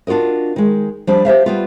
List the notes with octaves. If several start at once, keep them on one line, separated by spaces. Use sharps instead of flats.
D4 F4 F#4 A#4 D#5
D#3 G#3
F3 G3 D4
G4 C5 E5 F5
G3 B3 F4